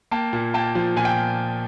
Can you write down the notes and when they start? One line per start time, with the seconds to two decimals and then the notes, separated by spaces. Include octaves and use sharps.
0.11 A#3 G5 A5
0.33 A#2
0.54 A#3 G5 A5
0.75 F3
0.96 A#2 G#5
1.05 G5